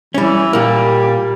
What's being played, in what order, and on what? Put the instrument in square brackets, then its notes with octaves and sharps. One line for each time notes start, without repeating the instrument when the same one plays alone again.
[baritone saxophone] E3 [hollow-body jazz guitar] G3 C#4
[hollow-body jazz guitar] A#2 A#3 [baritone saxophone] G3